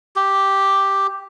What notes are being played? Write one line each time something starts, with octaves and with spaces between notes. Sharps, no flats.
G4